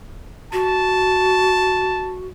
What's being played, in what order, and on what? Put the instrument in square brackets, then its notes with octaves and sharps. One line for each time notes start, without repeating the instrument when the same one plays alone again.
[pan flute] F#4 [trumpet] A5